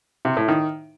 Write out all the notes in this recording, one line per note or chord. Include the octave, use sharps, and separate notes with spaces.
C3
A2
D#3